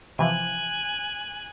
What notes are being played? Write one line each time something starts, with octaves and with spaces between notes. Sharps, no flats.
C3 E3 F3 G#5 F#6